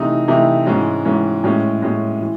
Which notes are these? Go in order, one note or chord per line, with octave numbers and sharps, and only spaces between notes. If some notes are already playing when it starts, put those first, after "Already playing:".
Already playing: C3 E3 A3 D#4
C3 E3 A3 D#4
G#2 E3 G#3 C#4
G#2 E3 G#3 C#4
A2 G#3 C#4
A2 G#3 C#4
E3